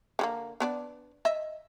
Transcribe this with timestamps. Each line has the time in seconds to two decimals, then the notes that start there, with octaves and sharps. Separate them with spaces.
0.19 D3 G3 A#3
0.60 B3 D4 D5
1.25 D#5 E5